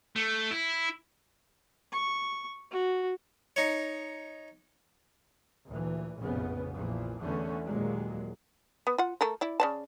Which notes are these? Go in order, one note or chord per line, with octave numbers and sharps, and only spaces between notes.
A3
E4
C#6
F#4
D#4 C#5
D2 A#2 E3
F1 A#1 A2 C#3 B3
A#1 A#2 E3 F3
E2 D3 E3 A3 B3 C#4
D#2 A#2 F#3 G#3
B3
F4 F#5
A3 A4 A#4
E4 D5
C#3 D5 A5